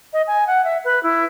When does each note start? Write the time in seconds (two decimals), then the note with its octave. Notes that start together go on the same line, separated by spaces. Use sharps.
0.13 D#5
0.27 G#5
0.47 F#5
0.64 E5
0.85 B4
1.03 E4